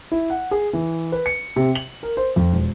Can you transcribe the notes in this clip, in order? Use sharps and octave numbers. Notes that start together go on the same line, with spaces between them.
E4
F#5
G#4
E3
B4
C#7
C3
F#7
A#4
C5
F2
E1